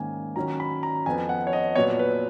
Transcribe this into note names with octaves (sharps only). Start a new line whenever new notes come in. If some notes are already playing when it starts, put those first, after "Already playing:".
Already playing: G#2 D#3 A#3 C#4 G#5
D#3 F#3 C#4 A#5
B5
A#5
F2 F3 B3 G#5
F#5
C#5
D#5
A#2 F#3 B3 C#5
B4